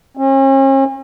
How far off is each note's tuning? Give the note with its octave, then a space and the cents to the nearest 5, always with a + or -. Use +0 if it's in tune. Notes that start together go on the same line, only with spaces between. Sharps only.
C#4 -45